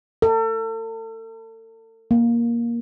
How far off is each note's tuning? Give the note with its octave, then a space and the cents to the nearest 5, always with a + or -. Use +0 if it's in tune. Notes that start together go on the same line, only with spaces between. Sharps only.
A4 +40
A#3 +10